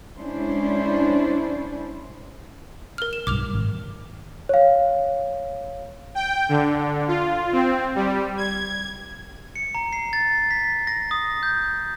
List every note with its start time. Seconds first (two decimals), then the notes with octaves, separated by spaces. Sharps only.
0.17 G#3 C#4 D4 E4 C5
2.98 A#4 F6
3.13 E7
3.27 B1 G2 D6 F6 F7
3.53 G#1
4.49 C#5 F5
6.15 G5
6.49 D3
7.08 F4
7.53 C4
7.96 G3
8.37 G#6
9.56 C#7
9.75 A#5
9.93 C7
10.13 A6
10.51 B6
10.87 A#6
11.11 D#6
11.43 G6